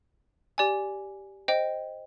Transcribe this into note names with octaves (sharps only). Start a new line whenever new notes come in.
G4 D5 G#5
C5 D#5 G5